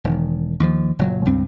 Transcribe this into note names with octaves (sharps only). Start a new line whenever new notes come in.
E1 D#3
D#2 F3
F#1 A#2 F#3
C#2 G2 C4